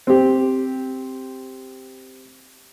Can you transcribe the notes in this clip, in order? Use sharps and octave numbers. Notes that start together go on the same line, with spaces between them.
C4 G4